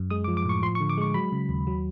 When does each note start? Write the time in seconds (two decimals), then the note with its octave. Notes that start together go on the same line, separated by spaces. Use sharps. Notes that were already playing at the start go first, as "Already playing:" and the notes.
Already playing: F#2
0.10 G#3 D#6
0.24 D6
0.28 F3
0.37 D6
0.45 A2 C#6
0.63 F3 C6
0.75 C#6
0.80 D3
0.89 D6
0.98 G#3 C#6
1.14 F#3 B5
1.32 C#3
1.49 D#2
1.67 F#3